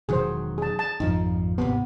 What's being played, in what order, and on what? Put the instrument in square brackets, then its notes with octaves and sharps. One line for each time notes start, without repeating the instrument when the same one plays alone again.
[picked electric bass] E1 D#3 F#3 [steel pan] G#4 C5
[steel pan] G#4 A5
A5
[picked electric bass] G#1 F2 F3 [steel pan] D#4
[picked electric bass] G#1 D#2 C3 [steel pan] B3